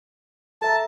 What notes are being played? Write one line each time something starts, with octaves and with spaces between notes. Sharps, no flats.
A4 E5 A5 A#5